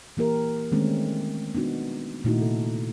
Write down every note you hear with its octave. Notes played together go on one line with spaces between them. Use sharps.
E3 A#3 G4 A#4
D#3 G#3 A3 C4 C#4
B3 D4 D#4 F#4
A#2 D#3 A3 D#4 E4 F#4
C3 A4